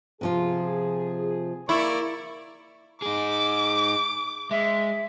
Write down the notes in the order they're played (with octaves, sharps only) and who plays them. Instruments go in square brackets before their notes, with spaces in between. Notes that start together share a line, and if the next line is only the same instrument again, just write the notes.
[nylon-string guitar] C3 F3 F4 [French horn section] G#4
[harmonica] A#3 D5 C#6 [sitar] E4
[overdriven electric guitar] D#4 G#4 [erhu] D6
[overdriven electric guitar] G#3 [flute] E5